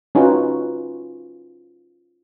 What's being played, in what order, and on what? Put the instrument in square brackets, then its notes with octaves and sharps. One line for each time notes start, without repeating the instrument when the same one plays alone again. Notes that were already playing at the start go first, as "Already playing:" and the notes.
[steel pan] C#4 D#4 F4 F#4 B4